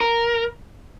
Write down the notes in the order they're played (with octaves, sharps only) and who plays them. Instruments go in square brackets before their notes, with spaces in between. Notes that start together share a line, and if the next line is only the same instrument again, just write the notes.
[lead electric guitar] A#4